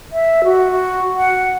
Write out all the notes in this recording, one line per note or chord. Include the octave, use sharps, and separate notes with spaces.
E5
F#4
F#5